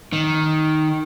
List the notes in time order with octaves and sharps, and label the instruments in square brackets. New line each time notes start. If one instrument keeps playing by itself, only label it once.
[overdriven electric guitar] D#3